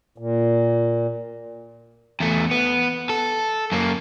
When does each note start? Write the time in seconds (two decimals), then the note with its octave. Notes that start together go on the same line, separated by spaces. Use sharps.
0.18 A#2
2.20 E2 A3
2.51 B3
3.09 A4
3.72 F#2 A#3